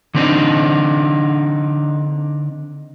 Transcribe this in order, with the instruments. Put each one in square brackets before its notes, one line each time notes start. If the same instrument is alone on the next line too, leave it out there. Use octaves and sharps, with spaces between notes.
[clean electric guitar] D3 C4 D4 D#4